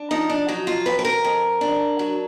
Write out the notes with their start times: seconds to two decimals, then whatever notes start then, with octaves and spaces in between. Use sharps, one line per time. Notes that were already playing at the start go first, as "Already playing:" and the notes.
Already playing: D4
0.11 F3 D#4
0.30 D4
0.48 F#3 D#4
0.67 F4
0.86 F2 B4
0.99 B4
1.05 A#4
1.24 F2
1.61 D4
1.99 F#3